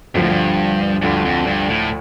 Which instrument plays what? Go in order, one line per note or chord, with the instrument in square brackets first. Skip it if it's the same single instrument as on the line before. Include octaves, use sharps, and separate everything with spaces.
[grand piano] D2 D3 F3 [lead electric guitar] G2
[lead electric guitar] A2
G2
[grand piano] D2 D3 F3 [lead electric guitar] G2
[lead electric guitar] F2
G2
A2